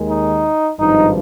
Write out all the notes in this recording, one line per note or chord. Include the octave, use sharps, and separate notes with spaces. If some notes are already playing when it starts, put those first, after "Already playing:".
Already playing: D#2 D#3 G#3
D#4
G#1 G2 F3 D#4